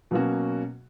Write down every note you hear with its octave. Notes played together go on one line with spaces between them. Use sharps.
B2 F#3 A#3 C#4 F#4